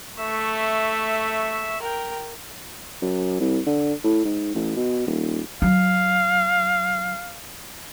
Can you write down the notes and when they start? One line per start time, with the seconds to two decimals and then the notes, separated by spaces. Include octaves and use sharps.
0.18 A3 E5 C#6
1.82 A#4 G5
3.02 F#2
3.40 C2
3.67 D3
4.04 A2
4.25 G#2
4.55 A1
4.76 B2
5.07 D#1
5.62 F#3 F5